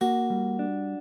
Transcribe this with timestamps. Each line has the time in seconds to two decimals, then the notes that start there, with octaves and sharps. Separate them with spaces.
0.01 A#3 F#4
0.30 G3
0.59 D4